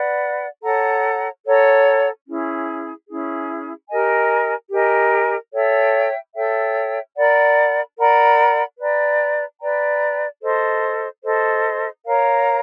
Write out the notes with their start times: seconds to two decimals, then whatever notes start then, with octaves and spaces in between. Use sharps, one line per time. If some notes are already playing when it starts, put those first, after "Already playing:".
Already playing: B4 D5 F#5
0.63 A4 C#5 F#5 A#5
1.45 A4 C#5 F#5 A#5
2.27 C#4 E4 G#4
3.08 C#4 E4 G#4
3.89 G4 A#4 D#5 G#5
4.71 G4 A#4 D#5 G#5
5.53 A4 C#5 E5 G5
6.34 A4 C#5 E5 G5
7.16 A#4 D5 F#5 B5
7.97 A#4 D5 F#5 B5
8.78 B4 D5 G5 A#5
9.60 B4 D5 G5 A#5
10.42 A4 C5 D#5
11.23 A4 C5 D#5
12.06 A#4 C#5 F5 A#5